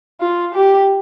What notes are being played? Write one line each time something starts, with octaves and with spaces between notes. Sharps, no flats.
F4
G4